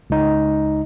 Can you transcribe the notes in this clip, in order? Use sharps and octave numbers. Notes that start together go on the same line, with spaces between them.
C#2 D#4